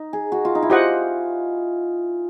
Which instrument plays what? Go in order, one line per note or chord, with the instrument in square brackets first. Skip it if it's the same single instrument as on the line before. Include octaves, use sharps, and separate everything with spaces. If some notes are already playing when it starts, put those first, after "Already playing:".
Already playing: [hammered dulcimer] D#4
G#4
F#4
F4
D#4
E4
[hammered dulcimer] F4 [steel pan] G4 C5 D#5 F#5